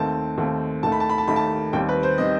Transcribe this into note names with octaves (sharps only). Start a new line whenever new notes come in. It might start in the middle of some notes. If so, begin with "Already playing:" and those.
Already playing: D#2 D#3 A3 C4 A5
D#2 D#3 A3 C4
D#2 D#3 A3 A5
B5
A5
B5
A5
D#2 D#3 A3 B5
A5
D#2 D#3 G3 C4 G5
B4
C5
D#3 G3 C4 D#5